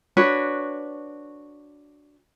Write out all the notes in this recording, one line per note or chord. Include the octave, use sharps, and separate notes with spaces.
D4 F#4 B4 C#5